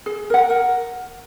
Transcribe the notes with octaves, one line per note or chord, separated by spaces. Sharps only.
G#4
A#4 F#5
A#4